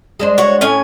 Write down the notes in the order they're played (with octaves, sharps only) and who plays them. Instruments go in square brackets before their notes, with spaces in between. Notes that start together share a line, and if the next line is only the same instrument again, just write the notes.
[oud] G#3 D4 C5
[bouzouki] F#4 C#5
A2 C#4 G#5